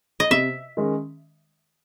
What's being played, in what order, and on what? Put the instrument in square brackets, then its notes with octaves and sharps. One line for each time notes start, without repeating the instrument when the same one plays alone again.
[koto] D#5
[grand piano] C3 [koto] E5
[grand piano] D#3 G#3 C#4